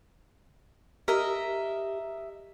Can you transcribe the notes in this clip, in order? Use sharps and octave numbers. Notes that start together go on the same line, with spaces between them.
G4 A#4 D#5 E5